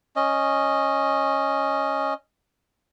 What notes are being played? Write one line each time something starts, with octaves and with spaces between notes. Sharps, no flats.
C#4 D#5